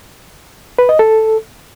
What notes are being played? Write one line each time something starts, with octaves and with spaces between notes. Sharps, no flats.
B4
D#5
A4